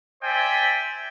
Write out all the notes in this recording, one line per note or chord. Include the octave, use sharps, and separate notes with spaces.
C5 D5 E5 G5 G#5